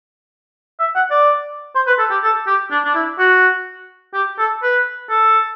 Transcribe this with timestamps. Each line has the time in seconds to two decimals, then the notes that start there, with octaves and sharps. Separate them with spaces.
0.79 E5
0.96 F#5
1.11 D5
1.75 C5
1.87 B4
1.99 A4
2.11 G4
2.23 A4
2.47 G4
2.71 D4
2.85 D4
2.95 E4
3.19 F#4
4.14 G4
4.39 A4
4.62 B4
5.10 A4